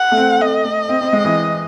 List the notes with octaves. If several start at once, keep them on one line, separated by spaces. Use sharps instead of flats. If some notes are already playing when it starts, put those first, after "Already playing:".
Already playing: F#5
A3
C4
A3 D#5
A3
C4
C4
G#3
E3